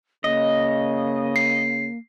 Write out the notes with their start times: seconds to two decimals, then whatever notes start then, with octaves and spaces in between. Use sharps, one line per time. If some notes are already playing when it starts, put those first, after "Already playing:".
0.24 C#3 A#3 D#5
1.36 C7